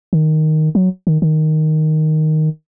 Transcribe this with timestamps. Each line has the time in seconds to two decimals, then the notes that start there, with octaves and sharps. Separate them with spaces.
0.13 D#3
0.75 F#3
1.07 D#3
1.22 D#3